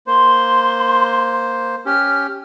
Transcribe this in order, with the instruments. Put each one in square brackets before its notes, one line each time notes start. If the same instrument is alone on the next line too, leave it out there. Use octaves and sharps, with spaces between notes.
[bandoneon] A#3 C5 [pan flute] C6
[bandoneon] C#4 G4 [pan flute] F6